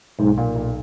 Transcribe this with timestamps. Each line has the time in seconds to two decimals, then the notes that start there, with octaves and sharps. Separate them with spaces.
0.19 B1 G#2
0.37 A#2
0.55 B1